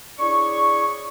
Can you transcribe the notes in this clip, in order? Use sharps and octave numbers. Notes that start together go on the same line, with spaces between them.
D4 E4 G#4 C#5 C#6